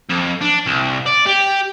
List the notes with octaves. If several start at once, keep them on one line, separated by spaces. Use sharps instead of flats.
F2
D4
C2
D5
G4